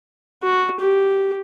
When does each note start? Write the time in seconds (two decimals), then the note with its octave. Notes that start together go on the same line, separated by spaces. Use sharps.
0.43 F#4
0.80 G4